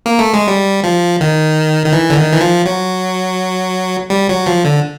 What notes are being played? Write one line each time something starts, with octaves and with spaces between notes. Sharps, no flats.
A#3
A3
G#3
G3
F3
D#3
D#3
E3
D3
D#3
E3
F3
F#3
G3
F#3
F3
D3